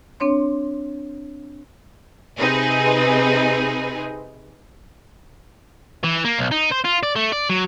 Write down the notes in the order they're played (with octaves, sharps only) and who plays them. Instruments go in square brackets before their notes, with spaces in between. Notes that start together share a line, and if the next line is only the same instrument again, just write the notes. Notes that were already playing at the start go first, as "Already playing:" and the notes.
[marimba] C4 D4 C#5 C6
[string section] C3 C4 D#4 G#4 B4
[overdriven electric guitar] E3
A#3
B1
D#4
C5
F4
D5
A3
D5
F#3